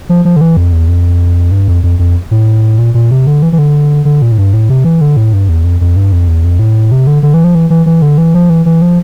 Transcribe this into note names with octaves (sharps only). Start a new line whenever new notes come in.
F3
F3
D3
E3
F2
E2
F2
G2
F2
F2
F2
A2
A#2
A#2
C3
D3
E3
E3
D3
D3
A#2
A2
G2
A2
C3
E3
D3
A2
G2
E2
F2
F2
G2
F2
E2
F2
A2
C3
D3
D3
E3
F3
E3
E3
E3
D3
E3
F3
E3
E3
F3